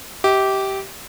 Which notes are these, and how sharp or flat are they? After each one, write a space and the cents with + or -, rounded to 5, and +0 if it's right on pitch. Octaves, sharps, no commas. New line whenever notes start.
G4 -15 E5 -45